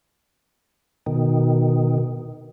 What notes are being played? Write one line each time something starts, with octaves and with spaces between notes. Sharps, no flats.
B2 D#3